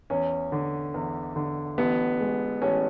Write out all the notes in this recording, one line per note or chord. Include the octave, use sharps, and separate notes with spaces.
E2 C#4
D3
E2
D3
A1 B3
G#3
A1 C#4